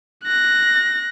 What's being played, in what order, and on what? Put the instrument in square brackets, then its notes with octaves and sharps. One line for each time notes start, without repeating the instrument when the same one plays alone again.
[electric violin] F#6 A#6